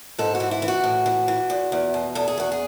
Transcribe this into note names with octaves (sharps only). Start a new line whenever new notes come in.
G#2 A4
F#4
E3
E4
E3
F#4
A2
E3
E3
E2
E2
B2
E2 A4
G#4
E2 F#4
G#4